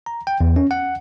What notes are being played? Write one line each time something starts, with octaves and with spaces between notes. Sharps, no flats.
A#5
G5
E2
C#4
F#5